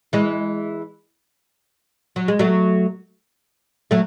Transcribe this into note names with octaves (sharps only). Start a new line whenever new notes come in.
E3 G#3
F#3
G#3
F#3 A3
F#3 A3